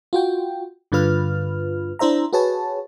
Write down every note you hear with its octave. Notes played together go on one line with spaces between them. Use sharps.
F4 F#4 G5
G2 D3 F4 B4 F6
D4 E4 C5 E5 A#5
F#4 G#4 B4 C#5 A5